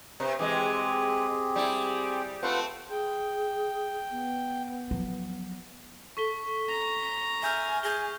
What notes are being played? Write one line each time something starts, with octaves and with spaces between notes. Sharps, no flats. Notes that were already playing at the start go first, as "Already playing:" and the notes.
C3 B4
E3 G#3 C4 G4 G#4
G3 E4
A3 C4 F4 B4 F#5
G#4 G5
B3
F3 F#3
A4 C#6 B6 G7
A#5
E5 G#5 F6 G6 F7
G#4 G6 A#6 G7